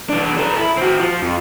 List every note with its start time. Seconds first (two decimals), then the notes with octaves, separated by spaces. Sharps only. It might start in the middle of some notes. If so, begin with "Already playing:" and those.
0.10 E3 D4
0.39 A4 B4
0.58 E4
0.78 C4 F#4
1.00 F3
1.22 F2